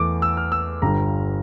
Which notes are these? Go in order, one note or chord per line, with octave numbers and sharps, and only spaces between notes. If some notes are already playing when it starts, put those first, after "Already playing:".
Already playing: E2 E3 A3 D6
E6
F6
E6
G1 G2 D3 G3 A#5